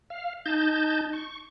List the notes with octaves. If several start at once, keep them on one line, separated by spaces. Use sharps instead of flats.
F5
D#4 A5 G6
C#6